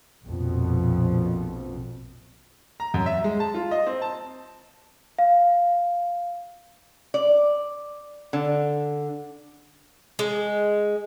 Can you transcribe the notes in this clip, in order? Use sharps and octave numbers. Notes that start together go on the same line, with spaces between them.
A#1 F2 B2
A#5
F#2
E5
G#3
A5
F4
D#5
C4
A5
F5
D5
D3
G#3